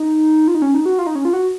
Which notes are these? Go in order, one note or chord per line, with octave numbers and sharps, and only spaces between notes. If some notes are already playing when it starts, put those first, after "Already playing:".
Already playing: D#4
F4
D#4
C#4
D#4
F#4
F4
D#4
C#4
F4
F#4